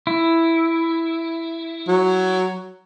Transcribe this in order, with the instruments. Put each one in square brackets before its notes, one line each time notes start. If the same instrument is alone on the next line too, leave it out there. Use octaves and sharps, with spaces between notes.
[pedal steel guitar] E4
[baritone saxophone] F#3